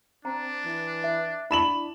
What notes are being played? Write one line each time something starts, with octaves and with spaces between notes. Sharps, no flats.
C4 D4 A#5
E3
E5
D4 E4 A5 B5 C#6 E7 F#7